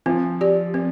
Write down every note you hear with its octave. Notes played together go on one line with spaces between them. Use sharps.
F3 C4
G4 D5
C4